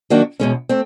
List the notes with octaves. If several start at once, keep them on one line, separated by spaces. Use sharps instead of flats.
D#3 F#3 A#3 D4 F#4
E2 B2 G#3 C#4
A3 C4